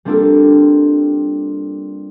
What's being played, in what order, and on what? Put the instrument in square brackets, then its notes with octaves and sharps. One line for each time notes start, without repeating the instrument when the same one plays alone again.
[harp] G3 A#3 C4 D4 F4 A4